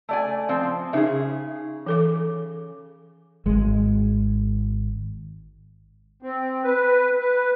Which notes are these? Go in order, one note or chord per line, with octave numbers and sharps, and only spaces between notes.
A3 D5 G#5
F3 C4
C#3 D#4 G#4 E5
E3 A4 D6
G#1 G#3
C4
B4
B4